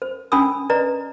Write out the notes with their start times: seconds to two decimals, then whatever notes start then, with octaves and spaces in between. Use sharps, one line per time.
0.02 C5
0.32 C#4 D4 G#5 B5 D#6 E6
0.70 B4 D5 D#5 A#5